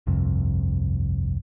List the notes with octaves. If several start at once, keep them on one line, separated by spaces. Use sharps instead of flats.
G1 C2 F2 C3